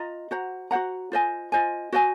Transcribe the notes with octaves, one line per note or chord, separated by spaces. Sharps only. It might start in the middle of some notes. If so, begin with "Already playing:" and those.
Already playing: F4 D#5 A#5
F#4 C5 F#5 A#5
F#4 C5 F#5 A#5
F4 C5 D#5 G#5
F4 C5 D#5 G#5
F#4 C5 D#5 G#5